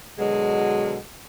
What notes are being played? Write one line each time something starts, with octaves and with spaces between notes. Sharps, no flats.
B2 D3 F#3 G#3